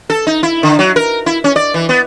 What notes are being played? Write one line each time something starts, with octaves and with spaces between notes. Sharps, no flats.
A4
D#4
E4
D3
F#3
A#4
E4
C#4
D5
E3
B3